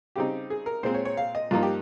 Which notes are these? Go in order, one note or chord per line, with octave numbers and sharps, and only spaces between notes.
C#3 G3 C4 D#4 G4
G#4
A#4
A#2 G#3 C4 C5
C#5
C#5
F5
D#5
G2 F3 A#3 D#4 F4
G4